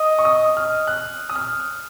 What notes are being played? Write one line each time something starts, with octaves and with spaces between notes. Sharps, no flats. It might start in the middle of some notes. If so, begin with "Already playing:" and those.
Already playing: D#5
C#6
D#6
F6
F#6
D#6
F6